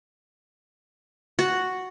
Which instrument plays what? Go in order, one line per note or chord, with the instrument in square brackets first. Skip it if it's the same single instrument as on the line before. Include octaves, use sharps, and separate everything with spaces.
[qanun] F#4